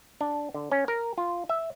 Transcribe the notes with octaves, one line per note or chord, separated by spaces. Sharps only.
D4
D3
C#4
A#4
F4
E5